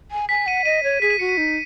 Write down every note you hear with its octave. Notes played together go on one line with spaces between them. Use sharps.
G#5
G#5 B6
F#5 D#7
D#5 D#7
C#5
G#4 B6
D#7
F#4 C#7
D#7
D#4